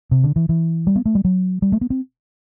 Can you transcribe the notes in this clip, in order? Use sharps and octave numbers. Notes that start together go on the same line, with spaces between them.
C3
D3
E3
E3
G3
B3
A3
G3
F#3
G3
A3
B3
C4